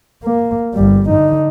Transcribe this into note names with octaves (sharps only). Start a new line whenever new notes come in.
A#3
G1 G3
D3 D#4